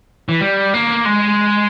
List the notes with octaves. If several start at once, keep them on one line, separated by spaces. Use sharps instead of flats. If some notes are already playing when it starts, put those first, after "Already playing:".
E3
G3
A#3
G#3